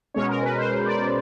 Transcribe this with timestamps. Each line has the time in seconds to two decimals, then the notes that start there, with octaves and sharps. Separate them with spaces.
0.14 B2 G#3 C#4 C#5
0.29 A#4
0.43 B4
0.57 C5
0.86 D5